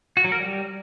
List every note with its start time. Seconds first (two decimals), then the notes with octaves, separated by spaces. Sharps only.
0.17 F#4
0.24 F#3
0.32 A#4
0.40 G3